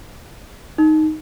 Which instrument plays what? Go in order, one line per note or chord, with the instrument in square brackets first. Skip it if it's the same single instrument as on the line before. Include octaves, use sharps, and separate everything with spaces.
[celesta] D#4